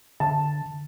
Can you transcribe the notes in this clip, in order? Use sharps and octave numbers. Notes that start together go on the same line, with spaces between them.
D3 A5